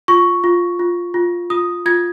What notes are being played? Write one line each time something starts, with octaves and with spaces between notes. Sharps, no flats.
F4 C#6
F4
F4
F4
F4 D#6
F4 G#6